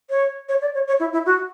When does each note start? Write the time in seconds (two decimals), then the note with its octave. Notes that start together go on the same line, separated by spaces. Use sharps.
0.10 C#5
0.49 C#5
0.61 D5
0.74 C#5
0.88 C#5
1.00 E4
1.13 E4
1.26 F#4